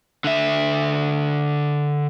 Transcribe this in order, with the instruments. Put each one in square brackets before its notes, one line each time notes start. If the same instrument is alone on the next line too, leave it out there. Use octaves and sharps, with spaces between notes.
[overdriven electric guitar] D3 E5